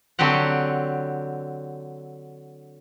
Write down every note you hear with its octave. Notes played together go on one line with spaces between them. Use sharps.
D3 F#3 C4 G4 F#5